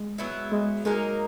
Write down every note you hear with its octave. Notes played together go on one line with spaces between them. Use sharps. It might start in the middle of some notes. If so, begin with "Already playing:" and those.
Already playing: G#3
F#3 B3 E4
G#3
F#3 G#3 A#3 D#4 A#4